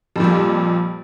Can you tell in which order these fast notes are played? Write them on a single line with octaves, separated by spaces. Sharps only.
F2 A#2 G3